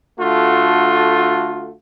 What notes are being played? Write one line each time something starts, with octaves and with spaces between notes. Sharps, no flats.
D3 A3 F4 F#4